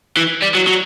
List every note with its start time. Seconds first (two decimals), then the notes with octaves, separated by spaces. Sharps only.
0.17 E3
0.42 G3
0.55 F#3
0.67 F#3